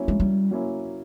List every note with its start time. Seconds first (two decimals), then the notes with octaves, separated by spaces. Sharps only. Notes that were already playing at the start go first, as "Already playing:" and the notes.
Already playing: F#3 A#3 C#4 E4
0.08 G#3
0.20 G3
0.51 F#3 A#3 C#4 E4